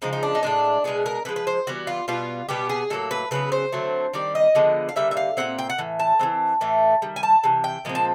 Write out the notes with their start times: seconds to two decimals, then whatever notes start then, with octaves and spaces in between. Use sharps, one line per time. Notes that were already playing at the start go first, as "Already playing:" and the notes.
0.02 C#3 F3 G#3 D#4
0.13 D#4
0.23 D4
0.35 D#4
0.43 A2 F3 G#3 D4
0.84 B2 G#3 B3 G#4
1.06 A#4
1.25 D3 F3 G#3 B4
1.36 B4
1.47 C5
1.67 E3 G3 B3 F#4
1.87 F4
2.08 B2 G3 B3 F4
2.49 B2 G3 B3 G4
2.69 G#4
2.90 A2 F#3 A#3 A4
3.11 B4
3.31 C#3 F#3 B3 B4
3.52 C5
3.72 D3 F#3 A3 C4
4.13 D#3 G3 C4 D5
4.35 D#5
4.55 D3 F3 G#3 B3
4.89 F5
4.96 D3 G3 A#3 E5
5.11 E5
5.17 F5
5.37 A#2 G3 C4 F#5
5.58 G5
5.70 F#5
5.78 A2 E3
6.00 A5
6.19 E3 G#3 C4
6.61 A2 E3 A3
7.02 D#3 G3
7.16 G#5
7.23 A5
7.44 C3 E3
7.64 G5
7.85 A#2 F3 G#3 C4
7.95 A5